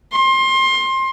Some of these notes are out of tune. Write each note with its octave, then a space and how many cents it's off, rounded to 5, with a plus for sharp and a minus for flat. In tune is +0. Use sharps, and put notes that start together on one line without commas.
C6 +25